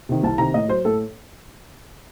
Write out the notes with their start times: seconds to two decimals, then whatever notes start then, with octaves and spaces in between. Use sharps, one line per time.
0.09 C3 D#3
0.23 C2 A5
0.38 C3 D#3 A#5
0.54 A2 D#5
0.69 F#3 C5
0.85 A2 A4